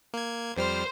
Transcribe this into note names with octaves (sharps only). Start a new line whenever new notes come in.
A#3 G#6
F2 G3 C5 F6